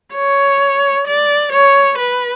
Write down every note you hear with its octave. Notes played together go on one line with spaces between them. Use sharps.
C#5
D5
C#5
B4